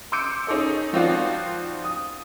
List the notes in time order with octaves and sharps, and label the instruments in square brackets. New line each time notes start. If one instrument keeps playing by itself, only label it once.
[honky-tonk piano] C6 D6 E6 G6 C#7 D7
C#4 D#4 G#4 A4 D#5
F3 C4 D#4 F4 F#4 D5
D#6